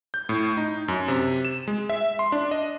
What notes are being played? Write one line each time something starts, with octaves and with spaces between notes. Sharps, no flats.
G6
A2
D#4
F#2
C3
E7
G#3
E5
C6
D4
D#5